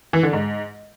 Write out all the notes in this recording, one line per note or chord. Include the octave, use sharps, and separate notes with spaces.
E3
D3
G#2